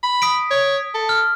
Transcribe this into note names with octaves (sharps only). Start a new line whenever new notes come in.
B5
D#6 B6 D7
C#5
A4
F6